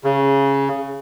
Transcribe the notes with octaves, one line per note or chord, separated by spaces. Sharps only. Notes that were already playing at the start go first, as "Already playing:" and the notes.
C#3